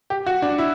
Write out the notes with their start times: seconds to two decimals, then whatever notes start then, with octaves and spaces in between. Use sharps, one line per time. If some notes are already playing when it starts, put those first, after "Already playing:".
0.10 G4
0.26 F#4
0.42 D4
0.58 E4